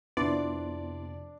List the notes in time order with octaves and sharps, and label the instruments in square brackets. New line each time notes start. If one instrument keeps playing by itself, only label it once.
[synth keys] F2 C3 [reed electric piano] B3 E4 C6 [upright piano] D4 [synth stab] D5